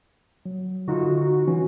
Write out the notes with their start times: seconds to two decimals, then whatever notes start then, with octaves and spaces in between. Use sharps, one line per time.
0.46 F#3
0.88 D3 D#4 F4 F#4
1.47 E3 C#4